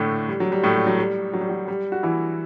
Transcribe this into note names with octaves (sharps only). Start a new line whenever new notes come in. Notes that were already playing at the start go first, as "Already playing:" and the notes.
Already playing: A2 D3 A3 D4
G3
F#3
G3
A2 A3
G3
F#3
G3
F#3
G3
F#3
G3
F#4
E3 E4